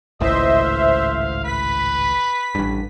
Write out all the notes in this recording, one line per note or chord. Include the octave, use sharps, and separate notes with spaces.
G#1 C#2 A2 C5 D#5 E5
F5
B4 B6
A1 G2